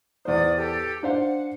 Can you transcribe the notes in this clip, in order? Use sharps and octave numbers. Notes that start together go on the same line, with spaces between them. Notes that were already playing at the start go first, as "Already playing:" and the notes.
E2 C5 D5 D#6
G4 A4
D4 C5 F5 F#5